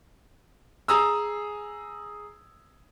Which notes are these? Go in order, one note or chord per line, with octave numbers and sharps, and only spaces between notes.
G#4 A#5 D#6 E6